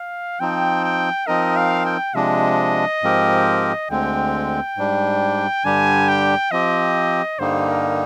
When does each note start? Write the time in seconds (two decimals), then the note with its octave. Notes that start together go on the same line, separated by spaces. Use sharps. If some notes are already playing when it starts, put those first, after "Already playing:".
Already playing: F5
0.40 F3 C4 D#4 G5
0.84 G5
1.27 F3 C4 D#4 A#4 D#5
1.57 F5
1.86 G5
2.14 C3 F3 G#3 D4 D#5
3.03 G#2 F3 C4 G4 A#4
3.90 D2 D3 G#3 C4 G5
4.77 G#2 G3 D4
5.64 G2 D3 G3 D4 G4 G#5
6.09 G5
6.52 F3 C4 G4 D#5
7.39 G2 D3 G3 A#3 D#4 C5
7.69 A#4